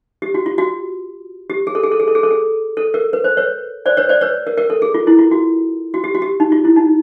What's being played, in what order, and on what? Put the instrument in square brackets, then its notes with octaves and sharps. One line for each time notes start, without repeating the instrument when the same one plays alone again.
[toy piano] G4
F#4
F4
F#4
G4
G#4
A4
G#4
A4
G#4
A4
G#4
A4
G#4
A4
A#4
B4
C5
B4 C#5
C5 D5
B4 C#5
C5 D5
B4 C#5
A#4
A#4
A4
G#4
F4
E4
F4
F#4
F#4
G4
F#4
G4
D#4
F4
E4
D#4